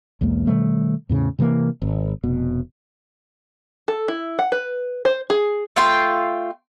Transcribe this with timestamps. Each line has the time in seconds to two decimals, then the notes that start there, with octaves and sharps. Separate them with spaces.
0.21 B1 E2 G#3 A#3
0.47 B2 D#3 G3 A3
1.09 E2 A2 C#3
1.39 C3 E3 A3 A#3
1.82 G#1
2.23 F1 B2
3.88 A4
4.08 E4
4.39 F#5
4.52 B4
5.05 C5
5.30 G#4
5.76 A3 F4 G5 C6